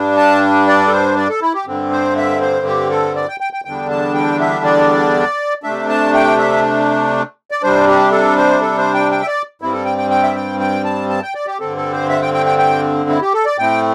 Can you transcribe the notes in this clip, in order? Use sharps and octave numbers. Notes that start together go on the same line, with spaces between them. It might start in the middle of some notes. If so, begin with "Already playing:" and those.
Already playing: G2 G3 D4
A5
D5
A4
C5
D5
A4
E4
G4
G2 D3 C4
C5
E5
C5
G4
A4
D5
G5
G5
G5
E2 D3 G3 D4 G5
A5
G5
E5
D5
C3 A3 D4 E5
A5
G5
E5
D5
C3 G3 D4 C5
G4
A4
C5
A4
C5
G5
G5
E5
D5
G2 G3 C4 E4
A4
G5
G5
G5
E5
G5
G5
A5
A5
G5
D5
G4
G2 D3 C4 A4
A4
C5
E5
G5
G5
G5
G5
E4
G4
A4
D5
A2 A3 C4 G5